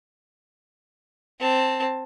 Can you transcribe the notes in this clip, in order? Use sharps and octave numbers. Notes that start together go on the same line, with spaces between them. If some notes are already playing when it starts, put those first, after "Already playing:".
C4 A5